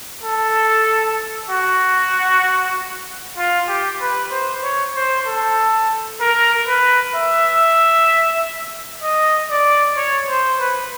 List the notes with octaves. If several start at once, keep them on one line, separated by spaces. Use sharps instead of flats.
A4
F#4
F4
G4
B4
C5
C#5
C5
A4
A#4
B4
E5
D#5
D5
C#5
C5
B4